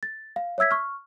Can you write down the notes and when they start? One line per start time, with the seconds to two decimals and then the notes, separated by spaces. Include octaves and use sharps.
0.03 A6
0.36 F5
0.58 C#5 E5 E6 G#6 B6
0.71 C#6 F6